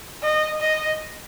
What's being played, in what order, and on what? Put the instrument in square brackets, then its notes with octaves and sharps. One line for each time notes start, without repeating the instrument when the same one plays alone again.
[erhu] D#5
D#5